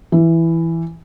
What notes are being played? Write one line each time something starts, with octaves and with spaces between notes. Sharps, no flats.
E3